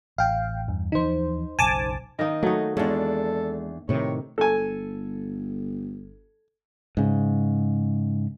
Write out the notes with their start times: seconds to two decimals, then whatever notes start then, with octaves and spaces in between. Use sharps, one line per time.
0.18 A1 F5 G5
0.68 E2 G2
0.92 D#2 E3 F3 D#4 C5
1.59 F#1 B1 F#2 G#5 A5 D6
2.19 D#3 A#3 D#4 D#5
2.43 F#3 A3 D#4
2.77 E2 G#3 D4 A4 C#5 F5
3.89 A2 C3 D#3 C#5
4.38 G1 A4 G#5
6.97 G#2 C#3